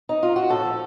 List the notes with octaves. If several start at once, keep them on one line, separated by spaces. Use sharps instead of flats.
D#4
F4
F#4
A2 A4
F3